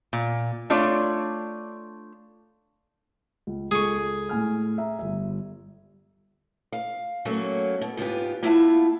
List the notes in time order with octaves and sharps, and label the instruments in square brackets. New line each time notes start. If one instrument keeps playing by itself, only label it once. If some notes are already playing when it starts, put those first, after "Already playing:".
[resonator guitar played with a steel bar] A#2
A3 D4 F4 C#5 D5
[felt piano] C#2
[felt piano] C#2 A4 [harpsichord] G#4 C#6
[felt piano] A2 G#5 F6
E5 A#5
G1 E5
[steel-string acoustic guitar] F5
F#3 A3 A#3 C#4
B2
G#2 B3 F4 G4
A#3 B3 E4 F4 E5 A5